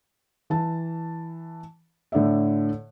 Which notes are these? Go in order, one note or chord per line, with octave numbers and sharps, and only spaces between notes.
E3 A5
A2 D3 D5 E5